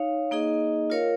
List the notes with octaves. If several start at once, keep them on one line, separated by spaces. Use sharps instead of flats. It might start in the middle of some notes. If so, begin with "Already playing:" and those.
Already playing: D#4 C#5 F5
A#3 D#4 G#4 D#5
F4 A#4 C#5 F5